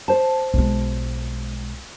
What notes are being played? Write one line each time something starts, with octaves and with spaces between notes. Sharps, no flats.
C5 A5
B1 G#3